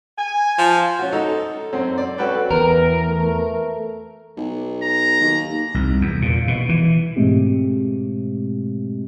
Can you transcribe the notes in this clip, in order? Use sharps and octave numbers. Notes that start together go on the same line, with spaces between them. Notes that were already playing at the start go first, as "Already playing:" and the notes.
G#5
F3
C#4 F#4
D#4 A4
F#2 C4
D5
C#4 F#4 A4 B4 G5
E2 E3 A#4 B4 A#5
A3
B1
A#5
D#2
C2
E2
A#2
B2
E3
G#2 B2 G#3 A3 C4 G4